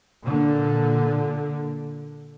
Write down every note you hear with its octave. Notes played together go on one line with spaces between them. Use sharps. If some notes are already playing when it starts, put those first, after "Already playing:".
A#2 D3